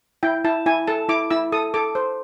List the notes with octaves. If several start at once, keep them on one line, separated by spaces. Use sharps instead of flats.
E4 G5
E4 A5
E4 G#5
A4 A5
E4 D6
E4 E6
A4 D#6
A4 D6
C5